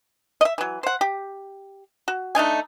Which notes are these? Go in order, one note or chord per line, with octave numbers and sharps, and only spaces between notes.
D#5 E5
E3 F#3
C5 F#5
G4
F#4
A3 D4 D#4 G#5